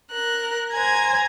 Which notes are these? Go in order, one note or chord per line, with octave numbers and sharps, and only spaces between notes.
A#4 F#6
C5 G#5 A#5 G#6